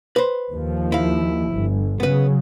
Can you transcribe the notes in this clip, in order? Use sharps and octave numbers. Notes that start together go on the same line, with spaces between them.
B4 C5
D#2 F3
E4 F5
G1
C#3 F#3 B3 B4